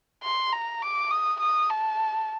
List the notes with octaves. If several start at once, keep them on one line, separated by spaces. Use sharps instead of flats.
C6
A#5
D6
D#6
D#6
A5